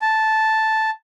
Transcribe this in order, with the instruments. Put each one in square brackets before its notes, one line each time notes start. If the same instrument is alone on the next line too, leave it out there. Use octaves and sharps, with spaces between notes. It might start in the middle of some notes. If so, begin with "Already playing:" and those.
[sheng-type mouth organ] A5